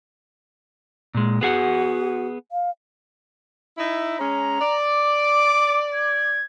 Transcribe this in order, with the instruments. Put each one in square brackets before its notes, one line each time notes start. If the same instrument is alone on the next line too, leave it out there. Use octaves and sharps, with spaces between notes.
[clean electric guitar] A#2 G#3
[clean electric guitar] B3 G#4 F#5 [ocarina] F#4
[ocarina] F5
[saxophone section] D#4 E4
[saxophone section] G#3 C#4 [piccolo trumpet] A#5
[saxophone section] D5
[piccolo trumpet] D6
G#6